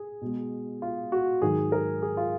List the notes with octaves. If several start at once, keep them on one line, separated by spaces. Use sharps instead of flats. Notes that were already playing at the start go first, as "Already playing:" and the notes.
Already playing: G#4
B2 G#3
F4
F#4
G#2 D#3 F#3 G#4
A#4
G#4
F4